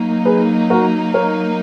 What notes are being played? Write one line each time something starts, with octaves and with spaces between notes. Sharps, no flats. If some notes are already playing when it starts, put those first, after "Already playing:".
Already playing: F#3 A#3 D#4
G#4 B4
F#4 A#4
A#4 C#5